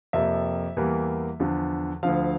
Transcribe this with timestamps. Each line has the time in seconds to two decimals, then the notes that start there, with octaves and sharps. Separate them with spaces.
0.13 F2 C3 F3 A#3 E5
0.76 E2 E3 G3 A#3
1.40 E2 D3 F3
2.03 D2 D3 F3 F5